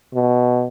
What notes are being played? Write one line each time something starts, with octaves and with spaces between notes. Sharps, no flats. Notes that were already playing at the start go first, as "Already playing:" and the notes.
B2